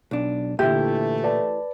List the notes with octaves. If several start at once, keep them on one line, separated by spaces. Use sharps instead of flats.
B1 D4
A#2 D3 E3 A3 E4 G4 E5
B4 D5 A5